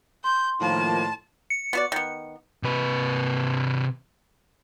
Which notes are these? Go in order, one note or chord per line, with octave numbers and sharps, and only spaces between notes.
C6 G6
A2 D#3 F3 A#3 A5
C#7
B3 F#4 D5
D#3 B3
C3 B4